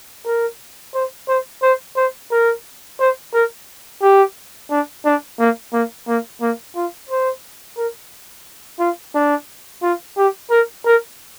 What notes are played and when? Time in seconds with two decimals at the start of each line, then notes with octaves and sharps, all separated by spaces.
0.26 A#4
0.94 C5
1.28 C5
1.63 C5
1.96 C5
2.31 A#4
3.00 C5
3.34 A#4
4.02 G4
4.70 D4
5.05 D4
5.39 A#3
5.73 A#3
6.07 A#3
6.41 A#3
6.76 F4
7.09 C5
7.77 A#4
8.80 F4
9.15 D4
9.83 F4
10.17 G4
10.50 A#4
10.86 A#4